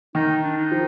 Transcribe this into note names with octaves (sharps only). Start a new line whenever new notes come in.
D#3 D#4
D4
D#4
F3